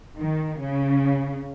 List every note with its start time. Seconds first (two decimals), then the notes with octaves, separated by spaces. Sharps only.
0.18 D#3
0.59 C#3